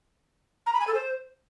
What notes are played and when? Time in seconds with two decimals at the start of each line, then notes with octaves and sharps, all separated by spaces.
0.66 A#5
0.73 B5
0.80 G#5
0.87 A4
0.94 C5